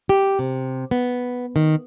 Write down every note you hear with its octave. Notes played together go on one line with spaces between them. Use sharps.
G4
C3
B3
D#3